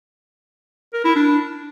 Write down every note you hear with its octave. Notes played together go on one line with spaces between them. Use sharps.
A#4
E4
D4